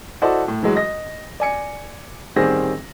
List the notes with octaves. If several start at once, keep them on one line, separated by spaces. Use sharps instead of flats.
E4 F#4 A4 C5 D5 D#5
A2
E3 F#3 G#3
D#5 A#6
D5 G#5 C#7
A1 D#3 G3 C4 G#4 A#6